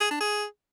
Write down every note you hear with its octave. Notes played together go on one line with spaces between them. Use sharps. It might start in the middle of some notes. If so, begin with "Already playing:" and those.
G#4
D4
G#4